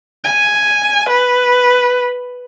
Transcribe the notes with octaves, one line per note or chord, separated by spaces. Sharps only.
G#5
B4